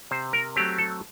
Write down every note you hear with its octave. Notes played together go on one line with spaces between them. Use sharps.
C3 C5
A#4
F#3 A3 C4 G4
A4